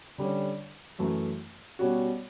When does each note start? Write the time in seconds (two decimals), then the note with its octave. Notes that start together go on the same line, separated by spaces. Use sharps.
0.18 D3 G3 C#4
0.99 F#2 E3 A3
1.79 B2 G3 C#4 F#4